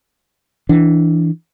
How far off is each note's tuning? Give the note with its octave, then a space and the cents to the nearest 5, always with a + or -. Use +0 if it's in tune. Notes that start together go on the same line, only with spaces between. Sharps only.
E3 +0 D4 +0